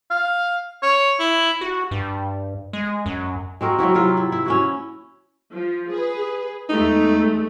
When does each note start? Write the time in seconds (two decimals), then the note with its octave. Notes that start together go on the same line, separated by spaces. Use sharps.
0.11 F5
0.83 C#5
1.19 E4
1.61 F#4
1.91 G2
2.73 G#3
3.06 F#2
3.61 G#3 C4 F#4 A#4
3.78 F#3 A#3 E4 F#4
3.94 C3 F#3 E4 F4
4.17 E4
4.32 E4
4.46 C#4 E4 F#4
5.52 F3
5.91 G#4 B4
6.69 E2 G#3 A3 D#4